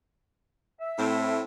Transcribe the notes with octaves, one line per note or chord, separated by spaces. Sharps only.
E5
A2 C4